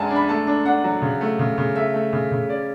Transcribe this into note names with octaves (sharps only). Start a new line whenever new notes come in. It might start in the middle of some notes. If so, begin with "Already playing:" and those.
Already playing: F#2 G#3 D4 D5 F#5 G#5 A5
D4
B5
A3 A5
D4
D4 F#5
F#3
C#3
A3
C#3
C#3
A3 E5
A3
C#3
C#3
C#4 D5